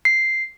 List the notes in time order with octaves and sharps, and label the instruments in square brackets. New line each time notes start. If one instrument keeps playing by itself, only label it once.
[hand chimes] C7